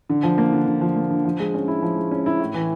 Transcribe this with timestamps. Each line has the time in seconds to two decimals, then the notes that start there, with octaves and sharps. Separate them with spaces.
0.10 D3
0.23 F3
0.38 A#3
0.53 D3
0.67 D3
0.81 F3
0.96 A#3
1.11 D3
1.25 F3
1.40 G#3
1.54 C#4
1.68 E4
1.82 F3
1.97 G#3
2.11 C#4
2.26 E4
2.40 A2
2.54 E3